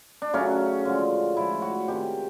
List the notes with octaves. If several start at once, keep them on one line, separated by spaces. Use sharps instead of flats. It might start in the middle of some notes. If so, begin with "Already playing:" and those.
D4
C#3 F#3 A3 C#4
D3 F3 G#3
A2 F3 G#3 E4
F#4
C3 D#3 G#3 G4